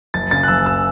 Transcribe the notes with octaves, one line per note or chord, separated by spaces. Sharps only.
F#1 A6
C#3 A6
F#6
F#1 E6
E6